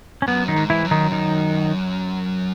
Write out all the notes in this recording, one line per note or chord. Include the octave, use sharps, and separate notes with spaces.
C#4
F#2 B3
D#3 D#4
G#2
E3 E4
F#2
D#3 D#4
D#3 D#4